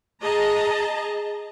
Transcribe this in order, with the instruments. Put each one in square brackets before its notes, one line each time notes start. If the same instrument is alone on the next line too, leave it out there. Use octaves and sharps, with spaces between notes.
[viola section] G#4 D#5 A5 A#5